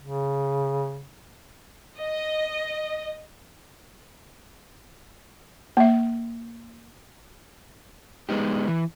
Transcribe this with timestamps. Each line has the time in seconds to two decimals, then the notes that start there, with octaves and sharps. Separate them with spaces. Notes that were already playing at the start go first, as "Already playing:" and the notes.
0.02 C#3
1.98 D#5
5.77 A#3 E5
8.29 G#3 B3 D#4 G4
8.68 E3